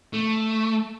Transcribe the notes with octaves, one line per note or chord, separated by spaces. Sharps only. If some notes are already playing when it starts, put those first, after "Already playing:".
A3